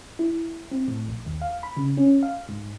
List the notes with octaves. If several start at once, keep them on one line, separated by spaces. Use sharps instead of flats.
E4
C4
A2
A#1
D#2
F5
B5
C#3
C#4
F5
G#2